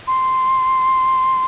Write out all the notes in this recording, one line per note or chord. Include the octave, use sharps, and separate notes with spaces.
C6